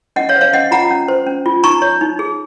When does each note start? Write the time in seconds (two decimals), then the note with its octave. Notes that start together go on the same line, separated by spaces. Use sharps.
0.16 C#4 D#5 F#5
0.29 C#5 F5
0.36 C5
0.41 C#5 F5
0.53 C#4 D#5 F#5
0.71 F4 F#5 A#5
0.91 C#4
1.08 C5
1.27 C#4
1.46 F4
1.63 D#4 A#5 C#6
1.82 C#5
2.01 D#4
2.19 G#4